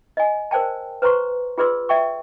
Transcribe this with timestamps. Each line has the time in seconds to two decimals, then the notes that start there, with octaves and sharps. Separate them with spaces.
0.17 D#5 G#5
0.51 A#4 C5 D5 G5 A5
1.02 B4 C5 A#5 C6 C#6
1.58 F4 G#4 B4 D5 C6 E6
1.89 D5 E5 G5 C#6